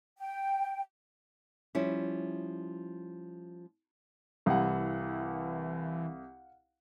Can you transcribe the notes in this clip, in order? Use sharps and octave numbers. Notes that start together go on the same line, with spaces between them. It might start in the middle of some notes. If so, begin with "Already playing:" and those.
G5
F3 G3 C#4 E4
C2 E3 F5 F#5